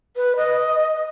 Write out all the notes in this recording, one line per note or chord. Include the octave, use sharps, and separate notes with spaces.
B4
D#5